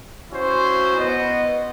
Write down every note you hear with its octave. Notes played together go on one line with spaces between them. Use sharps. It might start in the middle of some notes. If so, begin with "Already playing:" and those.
C#4 E4 F#4 C5
B3 D#5